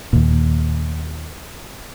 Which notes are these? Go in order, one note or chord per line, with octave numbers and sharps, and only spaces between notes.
D#2 A#2